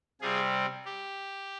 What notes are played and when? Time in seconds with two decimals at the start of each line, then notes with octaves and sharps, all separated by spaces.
0.21 C3 G3 C4 F4 G#4
0.85 G4